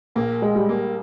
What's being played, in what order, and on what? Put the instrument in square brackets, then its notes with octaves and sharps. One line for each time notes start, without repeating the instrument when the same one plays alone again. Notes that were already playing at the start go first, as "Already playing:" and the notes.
[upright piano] A#1 [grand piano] A#3
[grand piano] G#3
[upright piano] G3
[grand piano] A#3